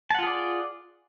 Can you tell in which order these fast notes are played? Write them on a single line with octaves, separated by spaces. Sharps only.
A5 F#5 F4 G#4 D5